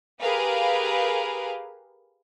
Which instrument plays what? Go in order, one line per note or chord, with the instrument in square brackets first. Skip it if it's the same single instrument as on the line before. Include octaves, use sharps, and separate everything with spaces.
[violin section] G4 G#4 A#4 B4 F5